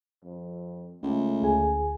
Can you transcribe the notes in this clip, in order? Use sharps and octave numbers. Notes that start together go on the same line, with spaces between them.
F2
C#2 A3
D2 G#4 G#5